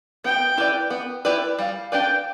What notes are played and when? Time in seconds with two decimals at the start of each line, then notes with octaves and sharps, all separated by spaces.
0.24 B3 G5
0.57 E4 G4 B4 D5
0.90 B3
1.25 E4 G4 B4 D5
1.59 G3 F5
1.92 D4 G4 B4 D5 G5